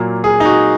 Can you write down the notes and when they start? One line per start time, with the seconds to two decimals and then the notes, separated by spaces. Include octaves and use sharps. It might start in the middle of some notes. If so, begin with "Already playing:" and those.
Already playing: A#2 F#3 A#3
0.24 G#4
0.40 D#4
0.45 F#4